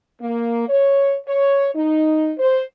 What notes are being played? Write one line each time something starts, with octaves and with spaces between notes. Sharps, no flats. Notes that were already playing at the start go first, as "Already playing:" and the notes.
A#3
C#5
C#5
D#4
C5